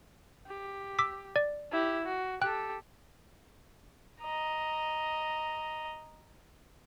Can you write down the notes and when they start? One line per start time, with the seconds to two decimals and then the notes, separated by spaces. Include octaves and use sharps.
0.47 G4
0.99 D6 E6 B6
1.36 D5
1.72 E4 G4
2.05 F#4
2.42 G4 A4 G5 F#6
4.21 D#5 A#5